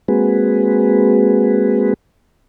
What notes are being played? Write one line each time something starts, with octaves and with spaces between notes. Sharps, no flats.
G#3 A#3 C4 F#4 G#4 B4